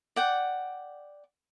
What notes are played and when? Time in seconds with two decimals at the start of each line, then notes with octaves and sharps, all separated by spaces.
0.16 D5 F#5 G5